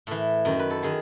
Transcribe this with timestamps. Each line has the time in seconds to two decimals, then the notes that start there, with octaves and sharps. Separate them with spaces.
0.07 A2 E3 A4
0.45 F#2 D#3
0.59 B4
0.70 A4
0.83 D#3 G#4